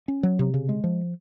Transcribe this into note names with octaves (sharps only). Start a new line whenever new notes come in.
C#4
F#3
C3
C#3
G#3
F3